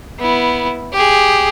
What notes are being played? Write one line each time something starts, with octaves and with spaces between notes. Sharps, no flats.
B3 E4
G4 G#4